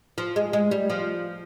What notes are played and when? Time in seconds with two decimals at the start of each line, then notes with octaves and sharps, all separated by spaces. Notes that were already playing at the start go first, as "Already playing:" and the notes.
0.18 F3
0.36 G#3
0.53 G#3
0.71 G3
0.90 F3